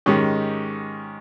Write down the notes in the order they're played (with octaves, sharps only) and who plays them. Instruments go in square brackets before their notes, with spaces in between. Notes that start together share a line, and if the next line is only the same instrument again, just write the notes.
[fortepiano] G#2 D#3 G#3 C#4 G4